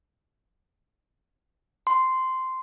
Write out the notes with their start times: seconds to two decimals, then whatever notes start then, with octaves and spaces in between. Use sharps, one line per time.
1.87 C6